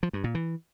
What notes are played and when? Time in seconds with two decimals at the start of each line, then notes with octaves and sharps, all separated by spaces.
0.03 F3
0.13 G2
0.24 A#2
0.35 E3